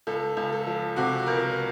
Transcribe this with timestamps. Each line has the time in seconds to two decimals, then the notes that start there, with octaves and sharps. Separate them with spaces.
0.07 C#2 A4
0.37 C#2
0.52 A4
0.67 F3
0.96 C3 F#4
1.26 C#2 A#4